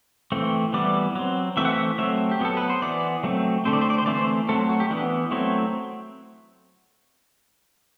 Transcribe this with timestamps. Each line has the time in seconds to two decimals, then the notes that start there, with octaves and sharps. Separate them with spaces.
0.32 E3 A3 C4
0.73 E3 G3 B3 D5
1.15 F#3 C4
1.57 E3 A3 C4 E5
1.65 F#5
1.73 E5
1.98 F#3 A3 C4 E5
2.31 G4
2.40 F#3 B3 A4
2.57 B4
2.70 C5
2.82 E3 B3 D5
3.23 F#3 A3 C4
3.65 D3 A3 C4 C5
3.73 D5
3.81 C5
3.90 D5
3.98 C5
4.06 E3 A3 C4 D5
4.14 C5
4.48 F#3 A3 C4 A4
4.69 F#4
4.80 G4
4.91 E3 B3 D4
5.31 F#3 A3 C4 E4